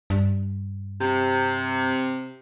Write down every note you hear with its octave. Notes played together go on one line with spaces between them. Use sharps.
G2
C3